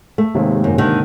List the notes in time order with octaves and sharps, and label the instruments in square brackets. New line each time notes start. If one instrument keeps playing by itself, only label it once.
[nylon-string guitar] A3
[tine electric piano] D#2 G#2 C3
[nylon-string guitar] F#2
D3 D#3